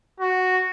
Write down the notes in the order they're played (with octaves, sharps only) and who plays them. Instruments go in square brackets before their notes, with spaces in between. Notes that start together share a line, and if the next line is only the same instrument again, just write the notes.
[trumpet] F#4